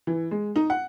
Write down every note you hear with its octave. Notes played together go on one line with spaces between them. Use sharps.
E3
G#3
D#4
F#5